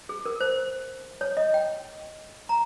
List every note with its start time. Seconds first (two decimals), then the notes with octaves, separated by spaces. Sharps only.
0.09 G#4
0.25 A#4
0.40 C5
1.21 C#5
1.37 D#5
1.54 G5
2.49 A#5